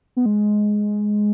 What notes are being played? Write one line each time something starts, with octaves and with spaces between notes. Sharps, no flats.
B3
G#3